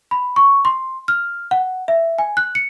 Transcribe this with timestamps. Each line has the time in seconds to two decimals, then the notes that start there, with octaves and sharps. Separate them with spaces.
0.11 B5
0.36 C#6
0.65 C6
1.08 F6
1.51 F#5
1.88 E5
2.19 G#5
2.37 F#6
2.55 C#7